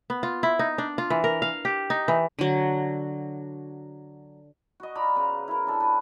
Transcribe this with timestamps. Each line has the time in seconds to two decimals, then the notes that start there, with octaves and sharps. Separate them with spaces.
0.10 B3
0.23 F4
0.43 E4
0.59 D#4
0.78 D4
0.98 F4
1.10 E3
1.24 A#4
1.42 F5
1.65 G4
1.90 D#4
2.08 E3
2.39 D3 F#3
4.80 F#4 D#5
4.95 F4 D5 A#5 B5
5.16 C#3 B4 A#5
5.48 E4 A#4
5.67 D4 A4
5.80 F4 G4 B4